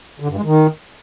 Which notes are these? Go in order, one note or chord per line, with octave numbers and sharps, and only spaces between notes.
D3
G2
G#3
D#3